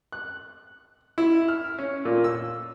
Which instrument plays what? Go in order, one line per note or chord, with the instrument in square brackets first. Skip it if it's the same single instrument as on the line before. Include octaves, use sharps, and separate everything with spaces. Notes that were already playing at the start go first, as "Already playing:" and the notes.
[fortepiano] F#6
E4
F6
C#4
A#2
E6